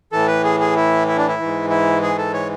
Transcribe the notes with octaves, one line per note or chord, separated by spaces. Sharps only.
A2 E3 A4
B4
G#4
G#4
E4
E4
D4
E4
G#2 E3
E4
G#4
A4
C#5